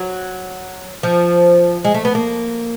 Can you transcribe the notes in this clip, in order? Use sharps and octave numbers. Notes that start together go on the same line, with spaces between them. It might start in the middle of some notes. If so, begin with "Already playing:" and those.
Already playing: F#3
F3
G#3
A3
B3
A#3